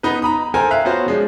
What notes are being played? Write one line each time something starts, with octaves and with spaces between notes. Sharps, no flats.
B3 D#4 B4
A#5 B5 D#6
A4 A#4 C5 G5 G#5 A#5
E5 F5 F#6
B3 C#4 F4 F#4 C5
F3 G#3 D4